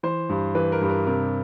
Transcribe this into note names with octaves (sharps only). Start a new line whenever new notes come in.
E3 C5
G2
E3 B4
A#4
G2
A#4
C3 A#4